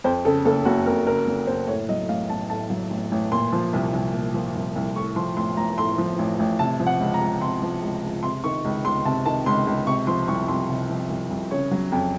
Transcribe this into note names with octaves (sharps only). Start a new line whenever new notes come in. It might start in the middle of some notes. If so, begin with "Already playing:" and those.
F2 C5
C#3 A4
F#1 A4
F#1 F#4
F2 A#4
C#3 A#4
F#1
F#1 C5
A2 C#5
F#3 D#5
A1 F5
A1 A5
A2 A5
F#3
A1
A1
A#2 C6
F3
C2
C2
A#2
F3
C2
C2
A2 C#6
F3 C6
A1 C6
A1 A#5
A2 C6
F3
A1
A1
C3 A5
F3
F#5
C#2
A#5
C#2
C3 C6
F3
C#2
C#2
C3 C6
D#3 C#6
C#2
C#2 C6
C3 A5
D#3 A5
C#2 C6
C#2
C3 C#6
F3 C6
C2 C#6
C2 C6
C3
F3
C2
C2
C#3 C#5
F#3
F2